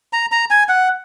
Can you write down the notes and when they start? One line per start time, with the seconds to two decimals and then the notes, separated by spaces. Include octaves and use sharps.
0.13 A#5
0.32 A#5
0.50 G#5
0.69 F#5